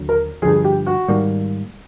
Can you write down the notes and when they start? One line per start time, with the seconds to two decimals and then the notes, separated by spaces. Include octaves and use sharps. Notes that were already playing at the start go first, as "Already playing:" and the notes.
Already playing: D#2 D3 F#3
0.09 A#4
0.42 F3 G#4
0.45 G2 D3
0.64 G4
0.86 F#4
1.08 G#2 D#3 G3 A#3